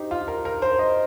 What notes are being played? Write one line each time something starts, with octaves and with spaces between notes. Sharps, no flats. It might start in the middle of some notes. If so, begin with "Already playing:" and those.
Already playing: D#4 G4 C5
F4
A#4
A#4
C5
D#5